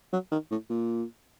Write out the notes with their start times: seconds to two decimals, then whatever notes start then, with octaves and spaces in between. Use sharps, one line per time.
0.13 F#3
0.32 D#3
0.51 A2
0.69 A#2